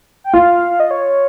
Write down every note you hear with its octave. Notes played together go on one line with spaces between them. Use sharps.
G5
F4 F5
D#5
C#5